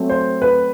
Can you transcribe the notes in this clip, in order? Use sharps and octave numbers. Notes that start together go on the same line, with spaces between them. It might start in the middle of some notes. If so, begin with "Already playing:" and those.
Already playing: F#3 A3 C4
C5
B4